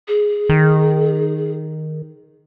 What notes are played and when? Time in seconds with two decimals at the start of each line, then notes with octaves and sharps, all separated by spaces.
0.08 G#4
0.49 D#3